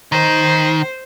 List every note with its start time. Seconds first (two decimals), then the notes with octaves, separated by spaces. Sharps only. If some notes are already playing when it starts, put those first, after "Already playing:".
0.12 D#3 C5